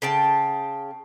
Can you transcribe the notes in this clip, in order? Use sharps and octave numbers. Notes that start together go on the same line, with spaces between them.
C#3 G5 A5